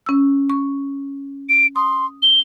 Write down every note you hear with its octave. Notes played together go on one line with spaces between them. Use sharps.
C#4 E6
C#6
D7
C6 D#6
G7